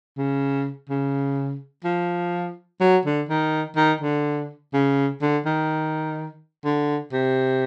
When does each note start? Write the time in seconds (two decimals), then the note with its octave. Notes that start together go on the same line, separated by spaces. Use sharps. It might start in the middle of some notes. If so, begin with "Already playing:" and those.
0.18 C#3
0.90 C#3
1.84 F3
2.80 F#3
3.06 D3
3.29 D#3
3.76 D#3
4.01 D3
4.74 C#3
5.22 D3
5.45 D#3
6.65 D3
7.12 C3